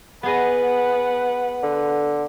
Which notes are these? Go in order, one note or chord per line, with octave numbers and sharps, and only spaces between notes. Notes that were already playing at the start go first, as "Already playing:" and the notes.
B3 G#4 B4 D#5 F#5
D3